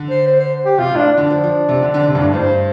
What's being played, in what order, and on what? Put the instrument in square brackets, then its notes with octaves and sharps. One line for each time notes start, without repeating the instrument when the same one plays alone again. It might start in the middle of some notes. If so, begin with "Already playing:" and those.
Already playing: [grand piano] D3
[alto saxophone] C5
C5
C5
G4
[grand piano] C3 [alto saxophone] F4
[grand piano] A2
[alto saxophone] D4
[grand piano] D3 [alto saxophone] D4
[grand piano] F3
F3
C3
D3
D3
C3
G2
A2
[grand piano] G2 [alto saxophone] C5